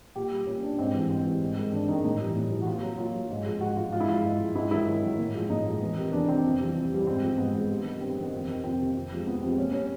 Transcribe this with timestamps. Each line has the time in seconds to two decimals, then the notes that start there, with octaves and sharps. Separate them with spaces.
0.16 A#2 G4
0.31 G3
0.46 A#2 C#4
0.63 G3 D4
0.71 C#4
0.78 G#2 C4
0.94 E3 G3
1.10 G#2 C4
1.26 E3 G3
1.41 G#2
1.57 D#3 G#3
1.72 G#2 D4
1.88 D#3 G#3 D#4
2.04 A2 D#4
2.20 E3 G3
2.36 A2
2.51 E3 G3
2.62 F#4
2.67 A#2 F4
2.82 F#3
2.98 A#2 F4
3.15 F#3
3.30 G#2
3.45 F3 G#3
3.61 G#2 F#4
3.76 F3 G#3 F4
3.93 G#2 F4
4.00 E4
4.08 F3 G#3 F4
4.24 G#2
4.40 F3 G#3
4.55 G#2 E4
4.71 D#3 F#3 E4
4.87 G#2
5.02 D#3 F#3
5.18 A2
5.34 F3 G#3
5.50 A2 D#4
5.66 F3 G#3
5.80 E2
5.96 C3 D#3
6.12 E2 D4
6.29 C3 D#3 C4
6.44 F2
6.59 C3 E3 G3
6.75 F2
6.91 C3 E3 G3
7.07 G#2 C4
7.23 F3 G#3
7.37 G#2 B3
7.54 F3 G#3
7.69 G2
7.85 D#3 G3
8.01 G2 C4
8.17 D#3 G3 C4
8.32 F2 C4
8.48 C3 D#3
8.64 F2 C4
8.79 C3 D#3
8.96 F2
9.10 C3 F3 G#3
9.27 F2 B3
9.42 C3 F3 G#3 C4
9.58 A#2 C#4
9.73 G3 C#4